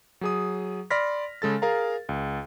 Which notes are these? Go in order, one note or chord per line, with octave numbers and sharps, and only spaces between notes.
F#3 G#4 D#6
D5 B5 C6 F6 A#6 B6
C#3 G#3 A4 A6
G#4 A#4 F5 A#5
C#2